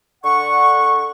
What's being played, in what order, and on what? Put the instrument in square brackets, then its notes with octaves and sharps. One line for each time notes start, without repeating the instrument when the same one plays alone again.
[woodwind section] D3 F#5 C#6